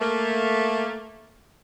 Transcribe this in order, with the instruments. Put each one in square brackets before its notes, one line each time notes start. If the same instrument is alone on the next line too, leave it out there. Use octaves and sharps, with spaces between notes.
[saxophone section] A3 A#3